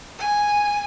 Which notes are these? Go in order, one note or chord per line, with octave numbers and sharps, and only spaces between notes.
G#5